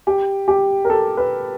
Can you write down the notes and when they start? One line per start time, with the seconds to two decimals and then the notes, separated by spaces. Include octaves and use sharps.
0.07 G4
0.48 G4
0.85 A#4
0.90 A4
1.17 B4